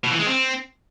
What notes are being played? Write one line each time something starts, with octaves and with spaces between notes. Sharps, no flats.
B2
E3
G#3
C4